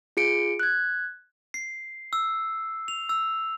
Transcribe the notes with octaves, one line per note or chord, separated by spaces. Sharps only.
F4 G#4 C#7 D7
F#6 G#6
C7
E6
F7
E6